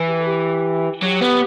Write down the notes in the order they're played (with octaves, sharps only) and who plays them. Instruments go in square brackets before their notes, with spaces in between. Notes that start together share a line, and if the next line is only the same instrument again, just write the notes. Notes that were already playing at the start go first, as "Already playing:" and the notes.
Already playing: [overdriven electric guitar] E3
[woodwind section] G4
A4
G4
[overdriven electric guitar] F#3 [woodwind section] G4
[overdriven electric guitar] B3